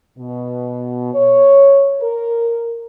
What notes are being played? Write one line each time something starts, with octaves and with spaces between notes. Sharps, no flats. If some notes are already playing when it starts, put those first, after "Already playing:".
B2
C#5
A#4